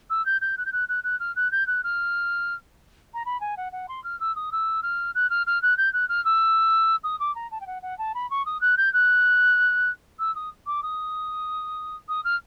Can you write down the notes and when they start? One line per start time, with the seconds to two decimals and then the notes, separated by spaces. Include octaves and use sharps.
0.10 E6
0.26 G6
0.41 G6
0.57 F#6
0.66 G6
0.72 F#6
0.89 F#6
1.04 F#6
1.20 F6
1.36 F#6
1.52 G6
1.67 F#6
1.84 F6
3.14 A#5
3.26 B5
3.41 G#5
3.57 F#5
3.72 F#5
3.88 C6
4.04 F6
4.20 E6
4.36 D#6
4.52 E6
4.83 F6
5.15 F#6
5.30 F6
5.47 F6
5.62 F#6
5.77 G6
5.93 F#6
6.09 F6
6.25 E6
7.04 D#6
7.20 D6
7.35 A#5
7.51 A5
7.61 G5
7.67 F#5
7.82 F#5
7.98 A5
8.15 B5
8.30 C#6
8.46 D#6
8.61 F#6
8.77 G6
8.93 F#6
10.19 E6
10.35 D#6
10.66 D6
10.83 D#6
12.09 D#6
12.24 F6